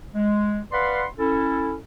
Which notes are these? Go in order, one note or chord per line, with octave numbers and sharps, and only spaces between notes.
G#3
B4 D5 F5 F#5 B5 C6
C#4 E4 A4